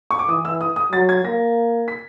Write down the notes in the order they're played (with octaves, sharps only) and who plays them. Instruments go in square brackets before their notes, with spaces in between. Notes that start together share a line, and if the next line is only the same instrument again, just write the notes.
[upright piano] C#6
D6
[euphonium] E3 [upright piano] D#6
[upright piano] E6
D#6
D#6
[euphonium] F#3 [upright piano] A6
[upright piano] G#6
[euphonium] A#3 [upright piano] A#6
[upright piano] B6